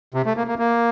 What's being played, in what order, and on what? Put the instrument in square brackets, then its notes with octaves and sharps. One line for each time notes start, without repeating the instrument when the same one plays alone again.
[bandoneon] C3
A3
A#3
A#3
A#3